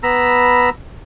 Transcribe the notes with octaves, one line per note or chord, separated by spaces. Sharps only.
B3 A#5 B5 E6